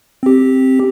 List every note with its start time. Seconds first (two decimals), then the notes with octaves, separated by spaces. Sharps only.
0.23 C4 G4